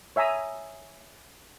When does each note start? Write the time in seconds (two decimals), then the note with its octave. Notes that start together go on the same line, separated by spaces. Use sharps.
0.16 C#5 E5 G#5 A#5 D#6